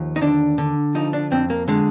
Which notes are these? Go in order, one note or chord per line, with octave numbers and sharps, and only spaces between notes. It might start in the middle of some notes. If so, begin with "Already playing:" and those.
Already playing: D#2 F3
D#4
D3 D4
D3
F3 D#4
D4
F2 C4
A#3
D3 G#3